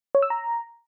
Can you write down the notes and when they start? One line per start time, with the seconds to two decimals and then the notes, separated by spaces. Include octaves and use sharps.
0.15 C#5
0.22 E6
0.30 A#5